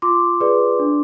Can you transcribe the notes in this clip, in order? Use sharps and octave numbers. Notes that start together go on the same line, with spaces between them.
F4 C6 D6
G#4 B4 D5
D4